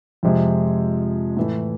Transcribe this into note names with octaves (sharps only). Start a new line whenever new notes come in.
F2 C3 F3 G#3
A2 E3 A3